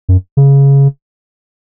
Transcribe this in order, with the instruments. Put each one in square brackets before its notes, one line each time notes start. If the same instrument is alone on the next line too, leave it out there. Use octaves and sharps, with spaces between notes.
[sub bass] F#2
C#3